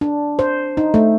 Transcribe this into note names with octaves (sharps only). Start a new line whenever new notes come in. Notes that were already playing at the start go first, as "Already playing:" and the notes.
D4
C5
D#4
A3